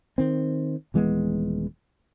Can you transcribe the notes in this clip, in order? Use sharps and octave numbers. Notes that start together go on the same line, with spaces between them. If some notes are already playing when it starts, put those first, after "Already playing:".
D#3 C4
D#1 E3 G#3 B3